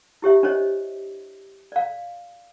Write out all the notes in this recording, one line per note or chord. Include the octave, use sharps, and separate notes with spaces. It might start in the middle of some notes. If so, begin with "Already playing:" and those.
E4 G4 C#5 E5
D4 C5 C#5 D#5
D5 F5